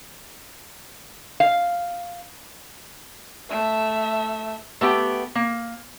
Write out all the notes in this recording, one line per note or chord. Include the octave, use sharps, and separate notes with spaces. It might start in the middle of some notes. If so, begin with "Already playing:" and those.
F5
A3 E5
A3 B3 G4 G5
A#3